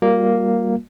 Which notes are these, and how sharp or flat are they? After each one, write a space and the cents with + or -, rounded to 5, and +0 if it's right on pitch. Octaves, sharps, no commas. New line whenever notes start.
G3 +0 A#3 +0 F4 +45